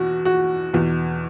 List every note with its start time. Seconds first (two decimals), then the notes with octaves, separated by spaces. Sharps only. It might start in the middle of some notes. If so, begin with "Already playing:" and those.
Already playing: E2 B2 F#4
0.25 F#4
0.73 E2 B2